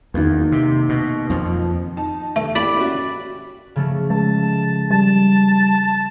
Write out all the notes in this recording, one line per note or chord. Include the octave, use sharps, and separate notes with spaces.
E2 D#3 A#3
C3
B2
F2 F3
D#4 A5
D3 A3
E3 A#3 G4 D5 B5
C#4 F#4
C#3 F3 A3
G#3 A5
G3 A5